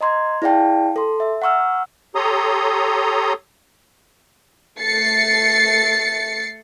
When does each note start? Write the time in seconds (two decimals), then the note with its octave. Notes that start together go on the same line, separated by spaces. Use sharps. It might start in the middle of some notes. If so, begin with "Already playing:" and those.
0.01 D#5 A#5 C6 G#6
0.42 E4 G#4 D5 F5 G5 A5
0.96 A4 C6
1.20 E5
1.42 F#5 A#5 C#6 E6 F6
2.15 G4 A4 C#5 A#5 C6 D#6
4.79 A3 A6 C7 C#7